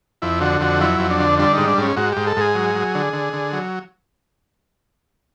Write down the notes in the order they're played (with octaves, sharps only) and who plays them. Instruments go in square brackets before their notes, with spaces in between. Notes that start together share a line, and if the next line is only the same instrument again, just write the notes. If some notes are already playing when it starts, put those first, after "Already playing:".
[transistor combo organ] F2 E4
D3 F#4
F2 F#4
F#3 E4
F2
D4
D3
G3 D4
G#2 D#4
D4
G#2 C#4
G#2 F#4
G#2 G4
A4
G#2 G#4
F#3
F#3
D3
D3
D3
F#3